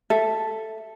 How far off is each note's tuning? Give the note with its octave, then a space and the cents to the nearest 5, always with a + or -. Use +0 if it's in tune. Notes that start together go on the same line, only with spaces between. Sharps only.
A4 +0 E5 +0